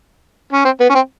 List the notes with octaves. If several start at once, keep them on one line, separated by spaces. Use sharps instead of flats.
C#4
C4
B3
C#4
C4